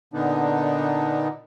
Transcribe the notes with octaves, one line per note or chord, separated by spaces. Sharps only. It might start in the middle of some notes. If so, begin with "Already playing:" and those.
A#2 D3 B3 D4 D#4